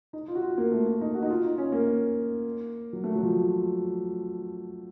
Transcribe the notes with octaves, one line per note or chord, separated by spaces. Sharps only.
D#4
F4
F#4
F4
A#3
A3
A#3
D#4
F#4
D#4
F4
D#4
C#4
A#3
F#3
A3
F#3
F3